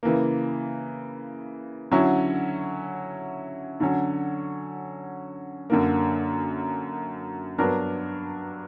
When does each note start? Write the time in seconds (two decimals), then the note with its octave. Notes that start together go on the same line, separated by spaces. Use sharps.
0.03 C#3 E3 A#3
1.92 D3 F#3 C#4 E4
3.80 D3 F#3 C#4
5.70 F#2 D3 A#3
7.58 G2 F#3 B3 D4 A#4